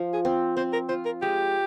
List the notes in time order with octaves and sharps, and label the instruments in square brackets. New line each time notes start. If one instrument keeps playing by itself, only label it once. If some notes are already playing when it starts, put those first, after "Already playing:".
Already playing: [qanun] F3
[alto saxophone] G#4
[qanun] C4
[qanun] C4 [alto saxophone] C5
[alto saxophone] A#4
[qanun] F4 [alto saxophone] C5
[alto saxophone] A#4
[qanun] G#3 [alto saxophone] G4